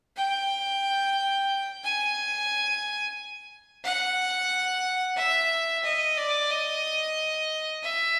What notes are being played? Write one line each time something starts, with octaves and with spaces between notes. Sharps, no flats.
G5
G#5
F#5
E5
D#5
D5
D#5
E5